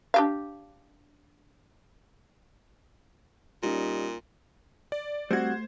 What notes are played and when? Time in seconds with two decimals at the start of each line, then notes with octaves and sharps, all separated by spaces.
0.14 D4 G4 F5
3.63 A#2 G3 C#4 D#4
4.92 D5
5.31 G3 A3 C4 F#4 C5 G#6